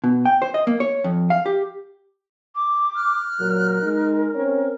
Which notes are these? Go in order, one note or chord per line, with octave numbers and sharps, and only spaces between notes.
B2
G5
C5
D#5
A#3
C#5
F2
F5
G4
D6
F6 F#6
A#2 F#3 A#4
G#3 D#4
C4 C#4 C#5